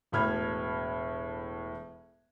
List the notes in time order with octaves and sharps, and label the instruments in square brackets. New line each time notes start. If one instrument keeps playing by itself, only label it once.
[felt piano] E1 A2 B5 F6 G#6